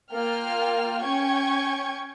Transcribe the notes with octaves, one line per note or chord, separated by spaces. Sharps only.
A#3 F4 G5 F6
C#4 G5 C#6 G#6